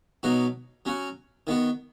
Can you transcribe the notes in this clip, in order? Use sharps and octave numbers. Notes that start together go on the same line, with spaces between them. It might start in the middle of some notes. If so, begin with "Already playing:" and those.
B2 F#3 D#4 F#4
F#3 C#4 F#4
D#3 B3 F#4